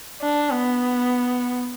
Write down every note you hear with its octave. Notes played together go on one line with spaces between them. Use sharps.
D4
B3